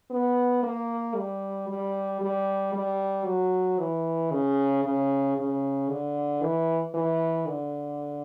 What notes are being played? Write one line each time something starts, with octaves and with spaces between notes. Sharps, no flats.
B3
A#3
G3
G3
G3
G3
F#3
E3
C#3
C#3
C#3
D3
E3
E3
D3